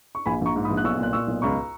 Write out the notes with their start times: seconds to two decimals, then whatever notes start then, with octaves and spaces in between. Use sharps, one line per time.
0.15 C#6
0.26 A#1 G#5 B5
0.41 A#1 A#5 C#6
0.56 G#2
0.64 B5 D#6
0.70 A#1
0.77 F#6
0.84 B1 C#6 E6
0.99 A#2 F#6
1.13 A#2 C#6 E6
1.28 B1
1.42 C#2 A#5 C#6